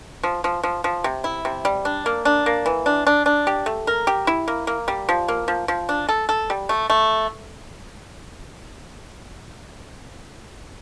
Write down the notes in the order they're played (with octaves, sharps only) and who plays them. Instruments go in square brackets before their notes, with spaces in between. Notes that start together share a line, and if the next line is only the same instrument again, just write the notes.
[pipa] F3
F3
F3
F3
C3
E4
C3
G3
D4
A#3
D4
A#3
E3
D4
D4
D4
G4
A3
A#4
G4
E4
A#3
A#3
G3
F3
A#3
F3
F3
D4
A4
A4
G3
A3
A3